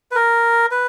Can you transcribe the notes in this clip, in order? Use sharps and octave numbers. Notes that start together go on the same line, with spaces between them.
B4
A#4
B4